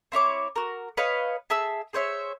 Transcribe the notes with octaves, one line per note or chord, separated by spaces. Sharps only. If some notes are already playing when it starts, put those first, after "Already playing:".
C4 E4 C#5 D6
F#4 A#4
B4 C#5 D#5 F5
G#4 E5 A5 E6
G#4 C5 C#5 E5